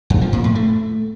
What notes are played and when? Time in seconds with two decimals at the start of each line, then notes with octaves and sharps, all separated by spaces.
0.10 F2
0.21 F3
0.33 A#2
0.44 A2
0.55 A3